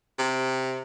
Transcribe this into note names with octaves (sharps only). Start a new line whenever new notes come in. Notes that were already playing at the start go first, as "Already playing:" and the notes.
C3